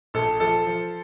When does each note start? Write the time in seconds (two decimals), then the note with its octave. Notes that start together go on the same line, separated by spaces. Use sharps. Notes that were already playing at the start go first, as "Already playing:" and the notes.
0.14 A#1 A4
0.40 F3 A4
0.66 F3